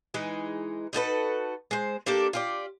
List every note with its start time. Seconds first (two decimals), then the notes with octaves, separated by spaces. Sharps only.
0.14 E3 G#3 D#4
0.93 D#4 F#4 A4 B4
1.71 G#3 C5
2.06 A#3 D4 G4 A4
2.33 F4 G4 D5